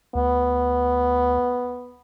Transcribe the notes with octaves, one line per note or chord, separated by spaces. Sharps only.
D2 B3